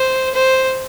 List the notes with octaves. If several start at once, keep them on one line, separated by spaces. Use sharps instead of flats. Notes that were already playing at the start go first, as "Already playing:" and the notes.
Already playing: C5
C5